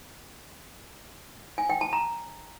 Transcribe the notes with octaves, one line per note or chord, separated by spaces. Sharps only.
G#5
G5
A5
A#5